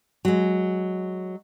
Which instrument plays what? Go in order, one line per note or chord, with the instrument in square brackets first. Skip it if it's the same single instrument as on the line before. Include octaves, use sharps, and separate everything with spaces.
[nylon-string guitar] F#3 G#3